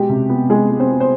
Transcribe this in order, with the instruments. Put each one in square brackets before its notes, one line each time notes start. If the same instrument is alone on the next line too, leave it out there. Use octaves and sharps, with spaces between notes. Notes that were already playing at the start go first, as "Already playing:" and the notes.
Already playing: [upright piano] B2 G#3 G4
C3
B3
G#3 G#4
G#3
C4 C5
B3
C5